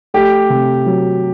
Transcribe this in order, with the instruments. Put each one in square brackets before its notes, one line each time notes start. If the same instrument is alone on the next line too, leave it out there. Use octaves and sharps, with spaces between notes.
[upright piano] A3 [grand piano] G4
[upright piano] C3
F#3